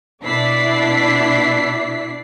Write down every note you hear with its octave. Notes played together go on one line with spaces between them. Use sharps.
B2 D4 E4 D5 B6 C7